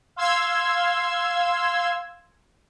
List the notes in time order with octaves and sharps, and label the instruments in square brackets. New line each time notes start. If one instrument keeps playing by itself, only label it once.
[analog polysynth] F5 C6 E6 G#6